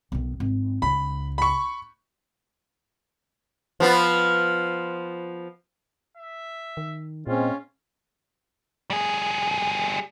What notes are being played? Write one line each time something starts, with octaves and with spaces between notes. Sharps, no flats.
B1 D#3
G#1
C#2 B5
B5 C#6
F3 B3 F4
E5
D#3
A#2 G#3 C4 C#4 F4
G3 G#4